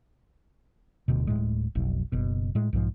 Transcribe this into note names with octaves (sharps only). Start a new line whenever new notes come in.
D1 D2 B2
D1 A2 G#3
F1 B1
F#1 B2
A2 G#3
B1 G#2 F3